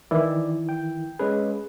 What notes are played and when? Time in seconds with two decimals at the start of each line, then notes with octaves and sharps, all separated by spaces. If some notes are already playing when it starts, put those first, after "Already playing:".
0.11 D#3 E3 E4 D5
0.69 G5
1.19 G#3 C#4 G#4 B4